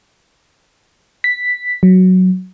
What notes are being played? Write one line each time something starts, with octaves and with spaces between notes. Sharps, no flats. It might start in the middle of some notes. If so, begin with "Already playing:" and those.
B6
F#3